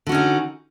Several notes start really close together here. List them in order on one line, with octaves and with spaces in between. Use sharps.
D3 F#4 C#4 D#4